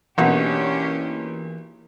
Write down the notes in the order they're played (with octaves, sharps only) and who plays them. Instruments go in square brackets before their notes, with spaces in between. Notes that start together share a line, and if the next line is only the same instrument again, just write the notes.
[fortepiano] B1 [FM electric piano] E3 [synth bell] A#3 E4 A#4 [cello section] C#4 D4 G4